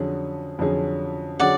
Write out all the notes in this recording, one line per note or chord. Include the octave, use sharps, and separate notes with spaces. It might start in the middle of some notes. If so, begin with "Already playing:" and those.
Already playing: F2 D3 F#3 C#4 G#4
F2 D3 F#3 C#4 G#4
D3 F#3 C#4 G#4 D5 F#5